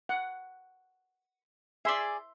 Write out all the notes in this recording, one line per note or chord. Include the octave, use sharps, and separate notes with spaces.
F#5
G#4 D5 E5 C6